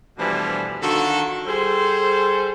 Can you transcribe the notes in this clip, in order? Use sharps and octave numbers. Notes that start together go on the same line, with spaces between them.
B2 E3 F3 G3 A3 D4
D3 D#3 F4 F#4 A4
G3 G#4 A4 C5